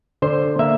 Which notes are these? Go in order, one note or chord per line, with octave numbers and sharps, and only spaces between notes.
D3 C5
A#3 E5